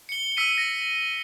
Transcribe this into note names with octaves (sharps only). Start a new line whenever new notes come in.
C#7 G7
E6 B6 C#7 D#7
A#6